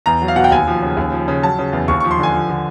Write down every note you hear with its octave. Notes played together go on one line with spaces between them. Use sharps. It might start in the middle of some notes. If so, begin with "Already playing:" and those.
E2 A#5
F#3
F5
B2 F#5
G5
D#2 G#5
F3
C#3
D#2
F3
C#3
F#3 A5
C#3
E2
D#2 C#6
C#6
F3
C6
D3 G#5
F3
D3